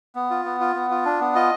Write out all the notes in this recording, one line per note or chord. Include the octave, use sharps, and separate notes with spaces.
B3
F4
B3
F4
B3
F4
D4
B3
F4 D#5